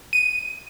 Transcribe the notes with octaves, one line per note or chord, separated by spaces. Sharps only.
D#7